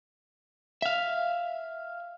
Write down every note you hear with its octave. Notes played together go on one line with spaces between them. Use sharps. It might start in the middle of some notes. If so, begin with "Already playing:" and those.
E5 F5